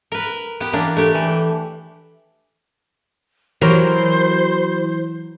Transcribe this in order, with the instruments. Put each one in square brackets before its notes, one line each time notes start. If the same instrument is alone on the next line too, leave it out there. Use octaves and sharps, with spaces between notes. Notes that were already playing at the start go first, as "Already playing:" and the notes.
[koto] A#4 B4
B3 G4
E3 A#3 D4
A3 D4 G4
E3
[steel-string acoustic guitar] E3 [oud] F#3 G4 A#4 [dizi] C5